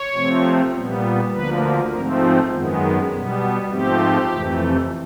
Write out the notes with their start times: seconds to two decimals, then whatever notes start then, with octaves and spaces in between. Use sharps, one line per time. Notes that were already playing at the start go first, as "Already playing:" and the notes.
Already playing: C#5
0.14 C3 F3 A3 C4
0.73 A#2 G3 B3
1.32 D2 D3 F3 A#3 B4
1.92 G#2 F3 A3 C4 A#4
2.22 G#4
2.51 F#2 D#3 G#3 B3
3.10 B2 G3 B3
3.70 G#2 F3 A3 C4 G4
4.29 F2 C3 E3 A3